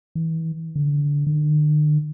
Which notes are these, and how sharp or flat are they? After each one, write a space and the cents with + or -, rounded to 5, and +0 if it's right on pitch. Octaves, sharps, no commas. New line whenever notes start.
E3 -30
D3 -20
D3 +45